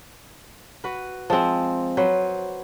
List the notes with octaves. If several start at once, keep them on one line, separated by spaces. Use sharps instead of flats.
F#4 B4
F3 G#3 C4
F#3 B4 C5